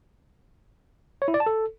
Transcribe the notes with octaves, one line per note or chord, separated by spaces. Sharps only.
C#5
E4
D5
A5
A4